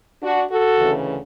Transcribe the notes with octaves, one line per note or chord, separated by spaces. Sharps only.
D4 F#4
F#4 A4
D2 C#3 E3